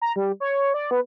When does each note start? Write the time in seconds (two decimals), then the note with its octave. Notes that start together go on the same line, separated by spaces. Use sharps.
0.02 A#5
0.16 G3
0.40 C#5
0.74 D5
0.91 B3